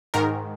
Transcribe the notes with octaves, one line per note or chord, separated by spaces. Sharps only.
G#2 D#3 A#4